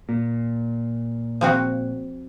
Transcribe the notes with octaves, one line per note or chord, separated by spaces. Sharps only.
A#2
F3 C4 F#4